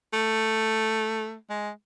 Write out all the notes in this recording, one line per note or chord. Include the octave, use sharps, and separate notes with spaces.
A3
G#3